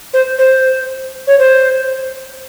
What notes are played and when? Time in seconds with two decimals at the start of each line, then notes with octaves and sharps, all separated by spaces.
0.14 C5
0.39 C5
1.27 C#5
1.39 C5